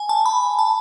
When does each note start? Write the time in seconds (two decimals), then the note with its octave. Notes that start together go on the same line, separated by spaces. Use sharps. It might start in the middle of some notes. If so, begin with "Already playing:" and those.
Already playing: G#5
0.09 A5
0.26 B5
0.59 A5